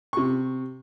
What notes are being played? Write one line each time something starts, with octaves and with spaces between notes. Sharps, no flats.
C3 C#6